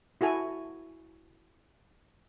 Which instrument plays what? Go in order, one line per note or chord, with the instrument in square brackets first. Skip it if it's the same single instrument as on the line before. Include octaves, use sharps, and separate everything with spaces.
[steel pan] E4 F#4 A4 G#5